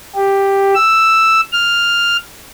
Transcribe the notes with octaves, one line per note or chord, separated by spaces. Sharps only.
G4
E6
F6